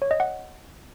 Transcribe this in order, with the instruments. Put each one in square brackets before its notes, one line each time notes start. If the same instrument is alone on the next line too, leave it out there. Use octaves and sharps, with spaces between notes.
[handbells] C#5
D#5
F#5